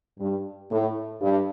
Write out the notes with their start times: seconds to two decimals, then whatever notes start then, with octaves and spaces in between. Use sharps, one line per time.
0.20 G2
0.71 A2
1.22 G2